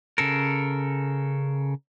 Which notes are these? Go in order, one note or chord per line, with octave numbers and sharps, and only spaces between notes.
C#3 A4 A#4